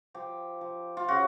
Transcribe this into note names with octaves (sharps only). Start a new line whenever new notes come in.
F3 G4
F3
F4
C#3 F#4